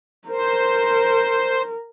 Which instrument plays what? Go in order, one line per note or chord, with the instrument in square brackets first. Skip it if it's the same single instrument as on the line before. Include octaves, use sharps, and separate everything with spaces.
[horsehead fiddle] A#4 [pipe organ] C5